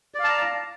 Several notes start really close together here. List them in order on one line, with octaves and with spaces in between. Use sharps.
D5 F5 A5 A#5